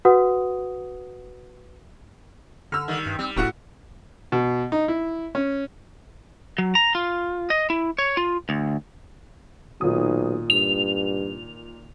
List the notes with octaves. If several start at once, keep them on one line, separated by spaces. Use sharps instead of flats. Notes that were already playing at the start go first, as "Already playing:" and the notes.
F#4 B4 F#5 D#6
D3 E6 F6
D#3 G3
G2
G3 C4
D#1 A2 F#4 F#5
B2
D#4
E4
C#4
F#3
A#5
F4
D#5
E4
C#5
F4
D2
B1 A#2 D#3 D#6
G2 F7